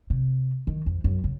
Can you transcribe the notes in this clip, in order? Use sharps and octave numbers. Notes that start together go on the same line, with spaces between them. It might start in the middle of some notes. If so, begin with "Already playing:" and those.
C3
D#3
F2
F#2
C#3